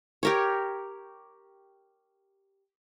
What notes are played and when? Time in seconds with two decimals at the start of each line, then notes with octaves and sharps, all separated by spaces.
0.23 G4 A#4 C#5